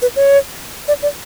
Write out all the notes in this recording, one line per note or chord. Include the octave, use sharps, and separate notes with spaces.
B4
C#5
D5
D5